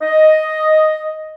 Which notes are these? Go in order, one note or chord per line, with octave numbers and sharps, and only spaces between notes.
D#5